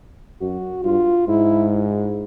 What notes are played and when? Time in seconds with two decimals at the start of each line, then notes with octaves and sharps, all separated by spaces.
0.41 F#2 F#4
0.84 G2 F4
1.28 G#2 E4